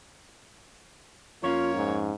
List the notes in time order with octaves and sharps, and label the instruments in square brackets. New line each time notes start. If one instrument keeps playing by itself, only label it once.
[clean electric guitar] F2 C#4 F5 [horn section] A#3 C#5 [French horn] F4
[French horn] G#2